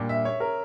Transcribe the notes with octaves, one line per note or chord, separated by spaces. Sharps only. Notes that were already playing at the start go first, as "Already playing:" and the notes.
Already playing: A#2 G3 D4 G4
E5
C#5
A#4